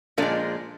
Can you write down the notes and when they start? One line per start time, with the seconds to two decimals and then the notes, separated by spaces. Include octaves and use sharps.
0.18 A#2 F3 G#3 A#3 D4